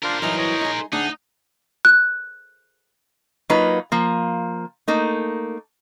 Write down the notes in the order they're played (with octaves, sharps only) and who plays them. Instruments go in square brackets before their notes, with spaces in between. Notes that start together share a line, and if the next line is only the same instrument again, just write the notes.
[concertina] D4 F4 [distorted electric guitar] A#4 C5
[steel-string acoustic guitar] G2 E3 F#3 [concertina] D#4 F6
[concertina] C#5 D#5
[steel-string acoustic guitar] D#4 G#4
[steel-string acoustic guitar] D2 D4 F#5 [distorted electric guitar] D#4 [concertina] G#4 F#6
[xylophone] F#6
[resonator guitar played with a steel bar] F#3 A#3 D#4 F4 B4
F3 A#3
A3 A#3 D#4